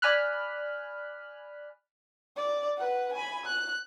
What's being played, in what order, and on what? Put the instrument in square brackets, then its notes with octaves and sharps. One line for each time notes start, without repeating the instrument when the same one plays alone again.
[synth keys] D5 G#5 B5 F6 F#6
[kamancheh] D5
B4 F#5
G#5 B5
F#6